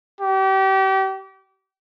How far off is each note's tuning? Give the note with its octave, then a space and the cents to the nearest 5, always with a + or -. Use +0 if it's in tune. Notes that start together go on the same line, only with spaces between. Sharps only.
G4 -35